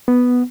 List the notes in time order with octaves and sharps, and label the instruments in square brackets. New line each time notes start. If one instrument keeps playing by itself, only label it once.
[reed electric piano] B3